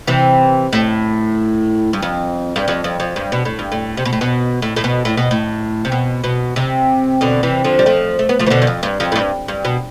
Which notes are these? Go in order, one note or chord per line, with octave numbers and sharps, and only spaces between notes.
C3 E3
A2
G2
F2
G2
F2
F2
F2
G2
B2
A2
G2
A2
C3
B2
A2
B2
A2
A2
B2
A2
B2
A2
C3
B2
B2
C3
B2 D3
C3 E3
D3 F3
G3
F3 A3
A3
B3
F3 A3
E3
B2 D3
G2
F2
G2
F2
A2
G2
G2
B2